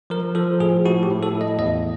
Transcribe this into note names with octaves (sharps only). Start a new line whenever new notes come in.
F3 A#4
F3 A4
A2 G#4
A2 F#4
G4
A2
A4
A2
D#5
E2 D#5